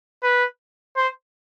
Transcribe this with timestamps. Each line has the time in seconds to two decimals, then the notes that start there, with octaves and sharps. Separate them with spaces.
0.23 B4
0.97 C5